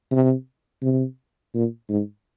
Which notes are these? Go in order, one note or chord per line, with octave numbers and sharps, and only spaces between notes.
C3
C3
A#2
G#2